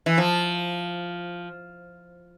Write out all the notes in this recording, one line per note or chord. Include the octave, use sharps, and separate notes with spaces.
E3
F3